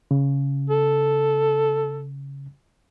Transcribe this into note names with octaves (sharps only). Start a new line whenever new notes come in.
C#3
A4